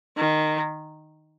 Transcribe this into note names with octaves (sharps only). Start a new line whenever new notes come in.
D#3